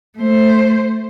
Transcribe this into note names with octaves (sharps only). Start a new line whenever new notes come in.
A3 C5